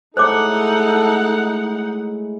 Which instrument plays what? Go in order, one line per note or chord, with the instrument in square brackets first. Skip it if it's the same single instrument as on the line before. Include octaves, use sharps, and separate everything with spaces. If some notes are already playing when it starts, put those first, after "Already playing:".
[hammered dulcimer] A2 G#3 [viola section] D#4 F#5 [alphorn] A4 [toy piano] C5 C#5 D6